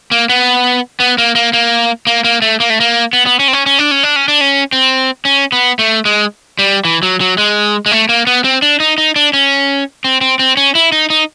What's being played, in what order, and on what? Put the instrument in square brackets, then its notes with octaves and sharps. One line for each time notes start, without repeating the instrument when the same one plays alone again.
[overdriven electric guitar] A#3
B3
B3
A#3
A#3
A#3
A#3
A#3
A3
A#3
A3
A#3
B3
B3
C#4
C4
C#4
C#4
D4
C#4
D4
C#4
D4
C#4
C4
C#4
B3
A3
G#3
G3
E3
F#3
F#3
G#3
G#3
A3
A#3
B3
C4
D4
D#4
D#4
D4
C#4
C4
C4
C4
C#4
E4
D#4
D#4